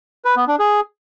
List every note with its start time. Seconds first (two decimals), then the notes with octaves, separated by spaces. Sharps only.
0.25 B4
0.36 B3
0.48 D4
0.59 G#4